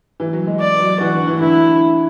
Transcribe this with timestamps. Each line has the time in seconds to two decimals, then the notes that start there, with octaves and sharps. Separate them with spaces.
0.20 E3
0.33 F#3
0.47 G#3
0.60 D5
0.80 F#3
1.00 E3 F#4
1.14 D3
1.27 E3
1.40 D3 E4